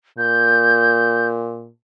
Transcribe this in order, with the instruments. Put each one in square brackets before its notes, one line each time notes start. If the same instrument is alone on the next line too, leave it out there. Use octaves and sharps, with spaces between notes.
[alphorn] A#2 [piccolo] G6